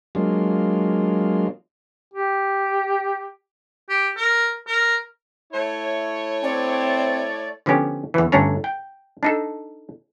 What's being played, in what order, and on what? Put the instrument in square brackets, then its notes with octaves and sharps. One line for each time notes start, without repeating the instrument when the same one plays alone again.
[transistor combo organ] F#3 G#3 A#3 D4 F4
[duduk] G4
[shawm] G4
A#4
A#4
[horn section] A3 E4 C#5
[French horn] C4 [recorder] D5
[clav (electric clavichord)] D3 F3 B3 C#4 G4
E2 E3
G1 A3 C#4 D4 C#5 A#5
G5
D4 D#4 A4